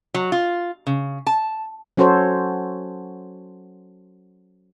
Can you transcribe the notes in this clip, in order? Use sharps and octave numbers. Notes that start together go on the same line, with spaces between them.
F#3
F4
C#3
A5
F#3 C#4 F#4 A4 C5 C#5